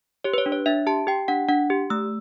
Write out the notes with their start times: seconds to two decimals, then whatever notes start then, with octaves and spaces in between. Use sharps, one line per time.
0.24 G4 C#5
0.34 B4
0.38 C#5
0.46 D4
0.52 C#5
0.66 D4 E5
0.86 G4 A5
1.07 G4 G5
1.28 D4 F#5
1.49 D4 F#5
1.70 G4
1.90 A3 E6